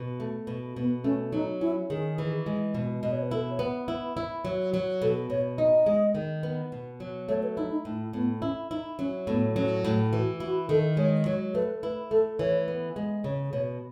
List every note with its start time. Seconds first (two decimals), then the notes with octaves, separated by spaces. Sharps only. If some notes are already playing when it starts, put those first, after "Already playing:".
Already playing: B2
0.20 A3
0.47 B2
0.76 B2 B3
1.04 A3 C#4
1.32 F#3 D#4
1.61 C#4 E4
1.90 D#3 G#4
2.18 E3
2.46 G#3
2.74 B2
3.02 B2 D#5
3.12 C#5
3.22 B4
3.31 E4 A4
3.50 C#5
3.59 B3 B4
3.88 E4
4.17 E4
4.45 F#3
4.74 F#3
5.02 B2 A4
5.30 B2 C#5
5.58 D#4 D#5
5.86 G#3
6.15 D#3
6.43 B3
6.72 B2
7.00 F#3
7.29 A3 C#5
7.43 B4
7.57 D#4 E4
7.71 D#4
7.85 A2
8.13 A2 B3
8.42 C#4 E4
8.71 D#4 E4
8.99 F#3 C#4
9.27 A2 B3
9.56 F#3 C#4
9.84 A2 E4
10.12 E3 F#4
10.40 E4 F#4
10.69 D#3 A4
10.97 G#3 C#5
11.25 F#3 C#5
11.55 A3 B4
11.83 E4 B4
12.11 A3 A4
12.39 E3 C#5
12.68 B3
12.96 G#3
13.24 C#3 C#5
13.53 B2 C#5